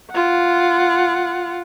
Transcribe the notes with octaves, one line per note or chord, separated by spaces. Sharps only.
F4 F#5